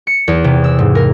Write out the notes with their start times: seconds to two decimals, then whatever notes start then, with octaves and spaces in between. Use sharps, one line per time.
0.07 C#7
0.28 E2
0.44 C3
0.64 E6
0.79 G#2
0.95 A#4